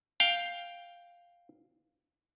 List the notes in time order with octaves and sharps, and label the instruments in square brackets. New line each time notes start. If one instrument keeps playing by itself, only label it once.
[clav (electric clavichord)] F5 G5